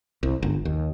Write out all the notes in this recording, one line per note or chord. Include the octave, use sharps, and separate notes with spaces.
C2
G1
D#2